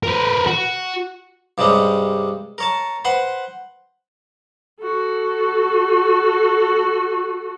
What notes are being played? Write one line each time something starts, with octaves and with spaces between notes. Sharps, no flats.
A#4 B4
F#4
G2 C3 G3 G#3 C#4
A#4 C#5 A5
B4 C5 F#5 C6
F#4 A4